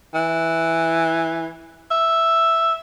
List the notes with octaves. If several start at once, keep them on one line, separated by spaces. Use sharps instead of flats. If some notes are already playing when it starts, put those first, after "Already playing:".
E3
E5